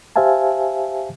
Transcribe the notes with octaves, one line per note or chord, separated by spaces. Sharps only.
G4 C5 E5 F5 G#5 A5